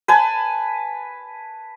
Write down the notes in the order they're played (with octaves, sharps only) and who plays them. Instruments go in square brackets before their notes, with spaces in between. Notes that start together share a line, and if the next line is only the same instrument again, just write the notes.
[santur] B4 G#5 A5